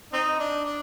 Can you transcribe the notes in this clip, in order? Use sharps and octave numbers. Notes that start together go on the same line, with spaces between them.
C4 D#4
D4
D4